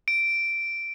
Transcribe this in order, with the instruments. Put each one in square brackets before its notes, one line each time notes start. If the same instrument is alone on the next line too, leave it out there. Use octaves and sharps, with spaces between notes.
[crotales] D7